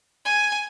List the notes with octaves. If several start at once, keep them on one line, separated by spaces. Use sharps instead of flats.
G#5